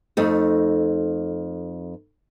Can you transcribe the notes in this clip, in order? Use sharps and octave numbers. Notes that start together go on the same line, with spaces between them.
F2 A3 D#4